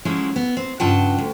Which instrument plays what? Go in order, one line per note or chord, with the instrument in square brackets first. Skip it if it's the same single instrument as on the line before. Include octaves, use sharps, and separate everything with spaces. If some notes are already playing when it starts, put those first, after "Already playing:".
[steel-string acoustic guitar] F3 F#3 G#3 C#4 E4
B3
C4
G2 C#3 F4 F#5 G5 A5
D2